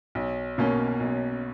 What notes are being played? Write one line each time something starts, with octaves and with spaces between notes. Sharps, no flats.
B1
B2 A#3 C#4
B1